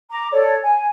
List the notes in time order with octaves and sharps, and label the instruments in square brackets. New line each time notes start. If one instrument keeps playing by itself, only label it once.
[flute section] A#5 D6
A4 C#5 D5
G#5